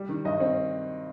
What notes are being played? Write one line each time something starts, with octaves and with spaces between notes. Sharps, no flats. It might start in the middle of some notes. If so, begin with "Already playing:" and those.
Already playing: G3
D#3
G2 D#5
C4